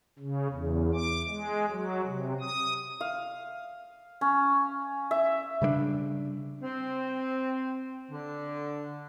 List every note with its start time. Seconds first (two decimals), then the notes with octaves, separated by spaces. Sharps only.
0.19 C#3
0.50 E2
0.94 D6
1.28 G#3
1.70 F#3
2.07 C3
2.41 D#6
3.01 F5
4.21 C#4
5.11 E5
5.62 C#3 G3 G#3 D4
6.60 C4
8.10 D3